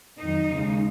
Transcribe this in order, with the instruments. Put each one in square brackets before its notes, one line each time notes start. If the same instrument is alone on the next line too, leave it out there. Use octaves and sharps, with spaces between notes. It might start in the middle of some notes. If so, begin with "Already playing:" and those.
[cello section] F2 D#3 F#3 D#4
D#2 C#3 G#3